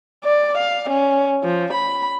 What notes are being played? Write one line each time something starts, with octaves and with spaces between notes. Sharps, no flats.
D5
F5
C#4
F3
B5